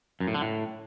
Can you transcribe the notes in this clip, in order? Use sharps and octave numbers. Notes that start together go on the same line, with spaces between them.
F#2
A2
D3
A2